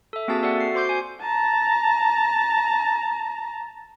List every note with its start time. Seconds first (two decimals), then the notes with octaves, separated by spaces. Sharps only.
0.13 A4 E5
0.28 A#3 C4 F#4 G#4 A5 A6
0.43 F#4 A4 D5 E5 F#5
0.60 C7
0.74 F#4 C5 C6 D6 G6 C7
0.89 G#5
1.22 A5 A#5